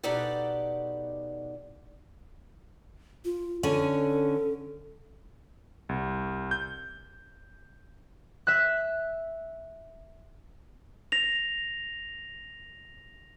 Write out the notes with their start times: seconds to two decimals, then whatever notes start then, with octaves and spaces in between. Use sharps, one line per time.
0.03 B2 D#4 G4 A4 D5 F#5
3.25 F4
3.63 D3 C#4 A4
5.89 C2
6.51 G6
8.47 E5 F#6
11.12 A#6 F7